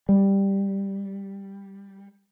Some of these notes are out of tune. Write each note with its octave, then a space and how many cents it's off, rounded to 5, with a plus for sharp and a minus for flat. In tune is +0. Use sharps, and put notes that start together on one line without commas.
G3 +5